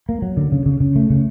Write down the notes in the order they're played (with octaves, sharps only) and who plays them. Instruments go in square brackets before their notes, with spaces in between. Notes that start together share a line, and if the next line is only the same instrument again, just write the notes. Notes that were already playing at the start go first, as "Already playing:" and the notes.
[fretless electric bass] A#3
F#3
D3
C#3
C#3
C#3
A3
C#3